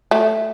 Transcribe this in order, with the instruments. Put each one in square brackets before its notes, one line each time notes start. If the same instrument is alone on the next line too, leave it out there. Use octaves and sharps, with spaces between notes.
[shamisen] A3